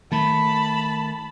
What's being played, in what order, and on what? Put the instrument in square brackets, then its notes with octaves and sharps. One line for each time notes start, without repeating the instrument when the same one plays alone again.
[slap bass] D#3 A3 [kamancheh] A5 B5